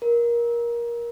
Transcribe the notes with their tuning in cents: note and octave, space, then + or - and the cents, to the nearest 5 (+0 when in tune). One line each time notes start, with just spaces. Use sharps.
A#4 +20